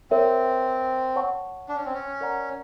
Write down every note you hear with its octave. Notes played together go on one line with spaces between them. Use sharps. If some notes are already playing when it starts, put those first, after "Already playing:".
C4 A#4 C#5 E5
C#5 F#5 A5 C#6
D4
C#4
C4
C#4
A#4 D5 F#5 A#5